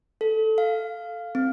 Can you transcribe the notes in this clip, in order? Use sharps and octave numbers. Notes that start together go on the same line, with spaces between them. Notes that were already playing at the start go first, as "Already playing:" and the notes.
A4
F5
C4